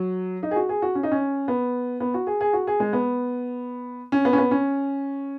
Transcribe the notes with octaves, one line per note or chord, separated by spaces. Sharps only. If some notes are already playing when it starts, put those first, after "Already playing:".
Already playing: F#3
D#4
G#4
F#4
G#4
F#4
C#4
D#4
C#4
B3
B3
F#4
G#4
G#4
F#4
G#4
G#3
B3
C#4
B3
C#4
B3
C#4